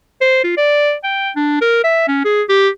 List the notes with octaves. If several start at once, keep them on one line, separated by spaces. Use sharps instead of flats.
C5
F4
D5
G5
D4
A#4
E5
C#4
G#4
G4